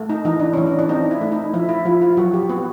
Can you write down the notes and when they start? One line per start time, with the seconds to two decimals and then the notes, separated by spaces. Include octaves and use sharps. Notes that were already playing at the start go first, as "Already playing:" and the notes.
Already playing: A3
0.10 D#4
0.25 E3 D#4
0.40 D4
0.53 E3 C#4
0.67 D4
0.79 D4
0.89 C4 D#4
1.11 E4
1.21 A3
1.32 D#4
1.54 F3 E4
1.69 E4
1.85 F3 F4
2.01 F4
2.17 F#3 F#4
2.34 G4
2.49 B3 F#4